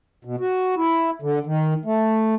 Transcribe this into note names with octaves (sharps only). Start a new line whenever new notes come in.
B2
F#4
E4
D3
D#3
A3